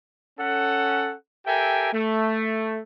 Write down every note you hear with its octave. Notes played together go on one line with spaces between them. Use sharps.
C#4 A4 F#5
G4 A4 A#4 E5 G5 G#5
A3